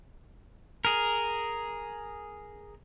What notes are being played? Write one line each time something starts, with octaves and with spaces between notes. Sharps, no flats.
G#4 A#4